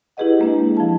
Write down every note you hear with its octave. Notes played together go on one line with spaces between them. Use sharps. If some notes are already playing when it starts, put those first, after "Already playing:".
E4 G4 G#4 B4 D#5 F#5
G#3 A#3 D4
F3 A5